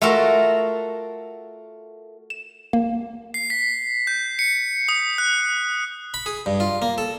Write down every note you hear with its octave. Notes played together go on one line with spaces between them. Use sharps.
A3 F4 F#4 A4 A#4
E7
A#3
C7
B6
G6
C#7
D#6
F#6
B5
G#4
G2
F4
A#3
A4